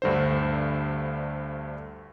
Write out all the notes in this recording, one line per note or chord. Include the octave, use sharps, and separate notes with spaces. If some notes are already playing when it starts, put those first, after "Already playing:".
D2 G2 D3 C5